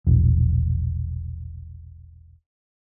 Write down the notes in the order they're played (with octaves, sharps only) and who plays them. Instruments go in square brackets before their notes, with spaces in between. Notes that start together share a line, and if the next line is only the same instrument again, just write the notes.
[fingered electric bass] E1 A#1